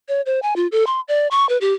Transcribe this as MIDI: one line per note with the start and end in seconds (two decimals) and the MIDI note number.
0.08 0.21 73
0.26 0.42 72
0.42 0.54 80
0.56 0.67 65
0.72 0.84 69
0.87 1.01 84
1.08 1.27 74
1.31 1.48 85
1.49 1.57 71
1.61 1.73 67